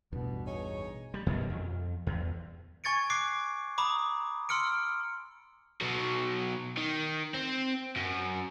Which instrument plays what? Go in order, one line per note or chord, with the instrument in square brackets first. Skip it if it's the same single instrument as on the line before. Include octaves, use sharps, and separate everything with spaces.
[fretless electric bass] A1 E2 G2 [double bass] B2
[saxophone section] D#4 G#4 C#5
[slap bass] G3
F#2 B2 E3 F#3
F2
E2
[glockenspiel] G#5 C#6 G#6 A6 C#7 D7
D6 F#6 C7 D7
A#5 B5 D6 D#6
C6 E6 F6 C#7 D7
[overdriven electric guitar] B2 F#3
D#3
C4
F#2